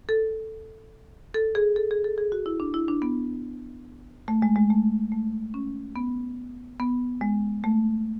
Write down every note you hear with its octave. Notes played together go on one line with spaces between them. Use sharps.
A4
A4
G#4
A4
G#4
A4
G#4
F#4
E4
D4
E4
D4
B3
A3
G#3
G#3
A3
A3
C#4
B3
B3
G#3
A3